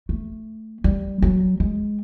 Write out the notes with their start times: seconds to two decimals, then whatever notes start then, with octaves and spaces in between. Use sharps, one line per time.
0.09 A3
0.84 G3
1.22 F#3
1.60 G#3